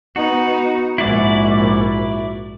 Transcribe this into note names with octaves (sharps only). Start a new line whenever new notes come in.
B3 D#4 F#4
A#1 G#2 E4 F#4 D5